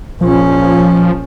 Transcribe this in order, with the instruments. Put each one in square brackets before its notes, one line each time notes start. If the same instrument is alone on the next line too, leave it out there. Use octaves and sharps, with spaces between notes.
[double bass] A#1 C#4 [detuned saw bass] F3